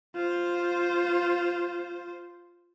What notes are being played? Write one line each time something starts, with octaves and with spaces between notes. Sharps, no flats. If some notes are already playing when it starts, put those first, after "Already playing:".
F4 C5